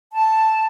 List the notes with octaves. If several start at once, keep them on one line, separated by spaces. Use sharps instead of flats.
A5